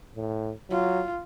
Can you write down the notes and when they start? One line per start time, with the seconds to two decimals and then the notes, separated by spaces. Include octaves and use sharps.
0.16 A2
0.70 F#3 F4